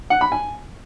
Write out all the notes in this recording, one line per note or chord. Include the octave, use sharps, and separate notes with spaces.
F#5
B5
G#5